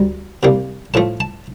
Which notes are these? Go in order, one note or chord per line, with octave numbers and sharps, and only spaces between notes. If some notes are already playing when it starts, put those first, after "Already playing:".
Already playing: D2 G3 A#5
C2 C3 G3 A#3
A2 F3 A3 A5
A5